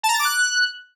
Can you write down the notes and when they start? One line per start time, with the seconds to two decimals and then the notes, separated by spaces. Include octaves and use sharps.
0.03 A5
0.09 A#5
0.14 A6
0.19 D6
0.25 F#6